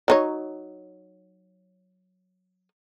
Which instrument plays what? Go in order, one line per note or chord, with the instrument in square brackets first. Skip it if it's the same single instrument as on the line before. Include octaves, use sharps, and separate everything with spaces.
[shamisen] F#3 D#4 C#5